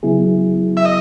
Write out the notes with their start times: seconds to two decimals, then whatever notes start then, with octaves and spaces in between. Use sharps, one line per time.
0.03 C#3 F#3 B3 E4 G#4
0.77 E5
0.85 D#5